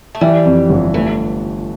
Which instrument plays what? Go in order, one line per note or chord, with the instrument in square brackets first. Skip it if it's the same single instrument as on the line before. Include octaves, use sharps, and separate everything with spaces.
[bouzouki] A3
[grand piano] E3 [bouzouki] G3
[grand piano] F2
G1
[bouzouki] E3 [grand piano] A3